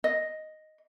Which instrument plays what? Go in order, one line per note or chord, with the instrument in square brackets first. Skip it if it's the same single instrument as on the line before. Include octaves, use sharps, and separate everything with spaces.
[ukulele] D#5